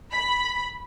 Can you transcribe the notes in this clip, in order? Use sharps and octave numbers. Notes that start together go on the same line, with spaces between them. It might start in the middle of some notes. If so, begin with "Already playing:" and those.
B5